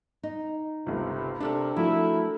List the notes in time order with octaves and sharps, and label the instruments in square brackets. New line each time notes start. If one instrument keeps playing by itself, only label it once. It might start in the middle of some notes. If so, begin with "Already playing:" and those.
[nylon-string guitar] D#4
[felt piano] G1 C#2 [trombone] C3
[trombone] C3 [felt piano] D4 A4 A#4
[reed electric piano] F3 F#4 [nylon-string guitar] A3 [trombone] E4